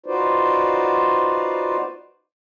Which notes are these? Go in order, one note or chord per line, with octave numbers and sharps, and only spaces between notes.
D#4 F4 F#4 B4 C5 D5